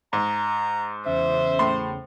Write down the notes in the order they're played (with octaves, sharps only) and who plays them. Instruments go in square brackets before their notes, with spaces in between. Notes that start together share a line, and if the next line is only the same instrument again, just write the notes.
[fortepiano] G#2 [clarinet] A#5
[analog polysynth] E2 C#3 [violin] C5 [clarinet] E5
[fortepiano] A2 C6